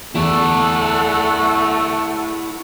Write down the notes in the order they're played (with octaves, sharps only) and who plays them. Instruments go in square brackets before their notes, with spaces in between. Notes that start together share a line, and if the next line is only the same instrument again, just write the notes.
[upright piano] E2 [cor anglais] A3 [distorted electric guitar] E4 D5 [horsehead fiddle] A4 F#5